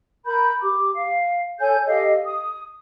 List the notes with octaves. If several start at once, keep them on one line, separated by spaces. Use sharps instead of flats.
A#4 B5 G6
G4 D6
F5
A4 C#5 G#5 G6
G4 A4 D#5 F5
D#6